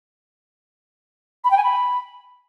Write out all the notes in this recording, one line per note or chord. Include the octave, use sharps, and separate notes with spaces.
B5
G5
G#5
B5